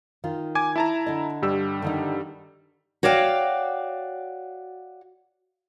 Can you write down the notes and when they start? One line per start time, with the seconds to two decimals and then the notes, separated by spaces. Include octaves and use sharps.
0.24 D#3 F4
0.55 G#5 D6 G#6
0.76 E4 A5 A#5
1.07 D3 D#5
1.42 G2 G3 E6
1.82 D3 D#3 D#4
3.03 F#4 C#5 D5 F5 G5